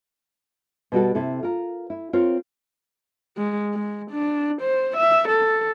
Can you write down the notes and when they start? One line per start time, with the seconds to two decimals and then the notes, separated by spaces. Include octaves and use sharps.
0.92 B2 G3 F#4 A4
1.15 C3 E4 A4
1.43 F4 A#4
1.90 E4
2.13 C4 F4 A#4 C#5
3.37 G#3
3.74 G#3
4.11 D4
4.62 C5
4.97 E5
5.29 A4